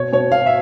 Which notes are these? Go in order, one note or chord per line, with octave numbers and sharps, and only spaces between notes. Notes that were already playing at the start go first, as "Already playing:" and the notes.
Already playing: B2 C#5
B2 C#5
B2 F5
E5